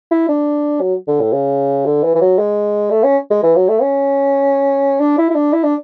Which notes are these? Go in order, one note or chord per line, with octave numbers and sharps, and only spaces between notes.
E4
D4
F#3
D3
A2
C#3
D3
E3
E3
F#3
G#3
A3
C#4
G#3
E3
F#3
A3
C#4
D4
E4
E4
D4
E4
D4